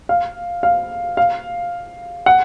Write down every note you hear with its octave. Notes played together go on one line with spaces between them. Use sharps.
F5
F5
F5
F#5